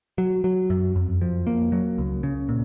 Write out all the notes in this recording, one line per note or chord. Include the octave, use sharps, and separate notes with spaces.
F#3
F#3
F#2
F2
F3
A#3
F#3
C#2
C#3
A#2